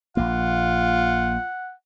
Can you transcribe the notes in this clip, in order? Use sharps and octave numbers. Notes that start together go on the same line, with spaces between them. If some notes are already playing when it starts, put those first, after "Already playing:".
A#1 A#3 F4 F#5